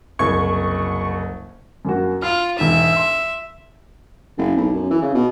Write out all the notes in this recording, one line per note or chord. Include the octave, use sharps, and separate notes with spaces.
F#1 C2 C#6 G#6
F#2 A#3 F#4
F4 F6
E1 G#2 E5
C6 E6
F#1
B1
F#2
E3
C#3
B2